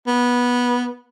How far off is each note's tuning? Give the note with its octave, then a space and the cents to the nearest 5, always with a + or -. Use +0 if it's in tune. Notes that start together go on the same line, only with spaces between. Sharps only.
B3 -15